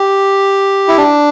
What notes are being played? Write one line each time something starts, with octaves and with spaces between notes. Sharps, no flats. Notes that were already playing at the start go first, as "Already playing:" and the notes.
Already playing: G4
E4
D4